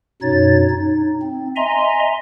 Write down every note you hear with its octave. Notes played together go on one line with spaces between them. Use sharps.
F#2 B2 D#4 C#5 A6
D#4
C4
D#5 E5 G#5 A#5 C6